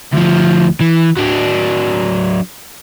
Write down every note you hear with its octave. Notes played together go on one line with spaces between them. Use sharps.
D2 F3
E3
F#3 D4